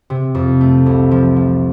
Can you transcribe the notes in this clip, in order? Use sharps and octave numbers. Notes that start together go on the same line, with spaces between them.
C3
F2
A3
C2
F3
F3